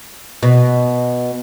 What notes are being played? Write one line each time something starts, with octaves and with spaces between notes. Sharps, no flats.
B2